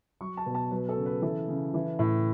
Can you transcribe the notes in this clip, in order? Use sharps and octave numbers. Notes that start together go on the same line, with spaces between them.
F#3 C#6
A5
B2
A5
F#3 B4
A4
C#3
B4
E3 A4
C#3
E3
A2